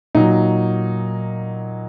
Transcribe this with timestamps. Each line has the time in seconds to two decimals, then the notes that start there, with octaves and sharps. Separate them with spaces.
0.15 A#2 F#3 D#4